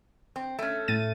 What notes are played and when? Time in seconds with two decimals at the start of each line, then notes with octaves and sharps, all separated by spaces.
0.36 C4
0.59 A3 C#4
0.88 A2 A6 D#7